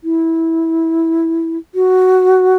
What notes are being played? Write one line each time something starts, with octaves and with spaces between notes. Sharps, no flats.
E4
F#4